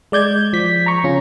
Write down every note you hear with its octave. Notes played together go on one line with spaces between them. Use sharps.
G#3 D5 G6 G#6
F3 B6
A#5 C#6
C#3 C#4 F4